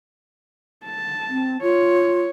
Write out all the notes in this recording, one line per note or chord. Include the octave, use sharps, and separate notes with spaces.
A5
C4
F4 C#5